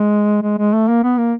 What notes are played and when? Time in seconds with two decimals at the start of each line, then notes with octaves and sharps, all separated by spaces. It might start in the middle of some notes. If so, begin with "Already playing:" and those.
Already playing: G#3
0.43 G#3
0.58 G#3
0.73 A3
0.88 A#3
1.03 B3
1.18 A#3